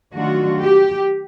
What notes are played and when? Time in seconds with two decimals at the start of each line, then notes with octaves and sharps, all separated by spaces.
0.15 D#3 F#3 A3 D4 F4 F#4
0.62 G4